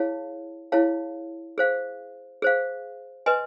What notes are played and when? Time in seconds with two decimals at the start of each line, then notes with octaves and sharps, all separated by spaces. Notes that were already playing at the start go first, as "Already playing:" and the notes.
Already playing: E4 G#4 C#5 F5 A5
0.72 E4 G#4 C#5 F5 A5
1.58 G#4 C5 F5
2.42 G#4 C5 F5
3.26 B4 D#5 G#5 C6